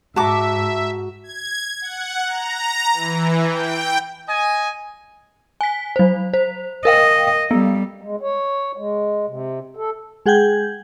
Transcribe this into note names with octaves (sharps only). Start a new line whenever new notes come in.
G#2 F#4 E5 A5 A#5 D6
G#6
F#5
A#5
E3
G5
D#5 G#5
G#5 B6
F#3 C5
C5
A#4 D#5 F5 G5
G3 B3
G#3
C#5
G#3
C3
A4
G#3 G#4 F#5 G5 G6 G#6